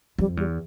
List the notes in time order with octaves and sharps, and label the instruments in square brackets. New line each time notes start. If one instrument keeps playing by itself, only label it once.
[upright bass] F2 [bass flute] G3
[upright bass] E2 [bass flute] G3